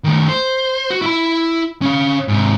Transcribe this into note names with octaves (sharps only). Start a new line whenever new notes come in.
D#3 A3
C5
F#4
E4 B5
C#4 F5
G#2 C3